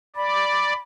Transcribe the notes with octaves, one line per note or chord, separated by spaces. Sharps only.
D5 B5